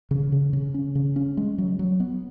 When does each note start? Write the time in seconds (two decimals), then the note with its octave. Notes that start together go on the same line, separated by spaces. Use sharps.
0.11 C#3
0.32 C#3
0.53 C#3
0.74 C#4
0.95 C#3
1.16 C#4
1.37 G#3
1.58 F#3
1.79 F#3
2.00 B3